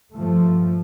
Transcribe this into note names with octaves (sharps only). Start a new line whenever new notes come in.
G2 F3 A3